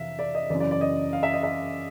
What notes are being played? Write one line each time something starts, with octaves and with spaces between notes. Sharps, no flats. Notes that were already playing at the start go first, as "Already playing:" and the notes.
Already playing: F2 C3 E3 E5 F5
D5
D#5
F#2 C#3 E3 D5
D5
D5
D#5
F5
E5
D#5
E5